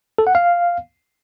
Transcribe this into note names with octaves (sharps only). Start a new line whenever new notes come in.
A4
F#5
F5